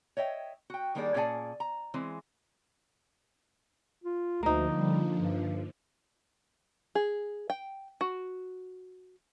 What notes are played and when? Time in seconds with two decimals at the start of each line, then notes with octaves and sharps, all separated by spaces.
0.17 C#5 D#5 E5 G5
0.70 F#4 G5
0.95 D#3 G3 A#3 D4 G#4 D5
1.14 A#2 C#4 G#4 D5 G#5 A5
1.60 A#5
1.94 E3 G#3 C4
4.04 F4
4.43 D2 D3 F3 A#3 D#4
4.73 G3
5.19 G2
6.95 G#4
7.50 G5
8.01 F#4